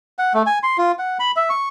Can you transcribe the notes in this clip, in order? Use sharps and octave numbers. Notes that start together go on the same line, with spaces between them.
F#5
A3
G#5
C6
F4
F#5
B5
E5
C#6